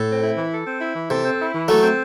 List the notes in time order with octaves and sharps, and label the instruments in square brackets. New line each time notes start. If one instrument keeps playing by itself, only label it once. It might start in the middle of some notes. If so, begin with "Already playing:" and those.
Already playing: [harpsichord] A2 [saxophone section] A4
[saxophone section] C4
E4
E3
A4
C4
E4
E3
[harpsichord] C3 [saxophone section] A4
[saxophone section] C4
E4
E3
[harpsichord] F#3 A3 [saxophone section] A4
[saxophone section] C4